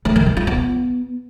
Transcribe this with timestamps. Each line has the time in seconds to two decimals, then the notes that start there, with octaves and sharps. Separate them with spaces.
0.05 A3
0.16 D#3
0.26 G3
0.37 F4
0.47 B3